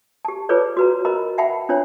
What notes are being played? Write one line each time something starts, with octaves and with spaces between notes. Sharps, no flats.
G4 A5
F4 G#4 A4 B4 C#5 D5
F#4 B4 A#5
A#4 C5 D#5 A#5 B5
E5 F#5 G5 A5 B5
C#4 D4 F4 C5 C#5